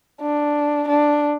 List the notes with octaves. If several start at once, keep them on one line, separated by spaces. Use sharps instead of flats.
D4
D4